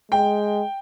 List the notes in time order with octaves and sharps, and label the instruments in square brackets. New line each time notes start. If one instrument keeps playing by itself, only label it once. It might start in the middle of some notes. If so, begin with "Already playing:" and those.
[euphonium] G#3 [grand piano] G5